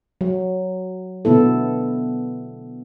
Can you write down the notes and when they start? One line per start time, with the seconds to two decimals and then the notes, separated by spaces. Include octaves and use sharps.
0.21 F#3
1.25 B2 D3 B3 E4 A4